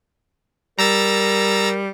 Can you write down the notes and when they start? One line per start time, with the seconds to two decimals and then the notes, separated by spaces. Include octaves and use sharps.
0.79 G3 A#4 A#5 E6 A6